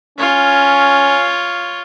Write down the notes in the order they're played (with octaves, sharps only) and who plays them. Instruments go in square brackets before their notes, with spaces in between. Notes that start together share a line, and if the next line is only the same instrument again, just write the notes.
[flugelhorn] C#4 [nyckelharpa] F4 C#5